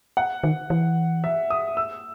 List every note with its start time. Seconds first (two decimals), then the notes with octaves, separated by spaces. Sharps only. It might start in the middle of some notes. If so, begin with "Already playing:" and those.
0.17 F#5
0.44 D#3
0.70 E3
1.24 E5
1.50 D#6
1.77 E6